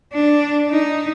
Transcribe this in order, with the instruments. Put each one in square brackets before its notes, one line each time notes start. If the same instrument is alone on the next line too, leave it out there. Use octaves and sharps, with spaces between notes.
[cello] D4
D#4